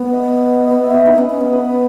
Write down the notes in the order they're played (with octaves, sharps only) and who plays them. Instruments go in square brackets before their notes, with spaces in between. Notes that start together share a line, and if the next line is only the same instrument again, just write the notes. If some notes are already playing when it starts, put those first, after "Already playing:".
Already playing: [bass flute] B3
[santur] D#5
D#5
D#5
E5
D#5
[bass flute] D#4 [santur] B4
[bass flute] B3
C#4
C#4
B3
[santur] B4